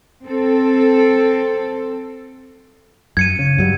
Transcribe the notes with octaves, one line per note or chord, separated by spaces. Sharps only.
C4 A4
F#2 G#6 C#7 D#7
C#3
G2 F#3 G3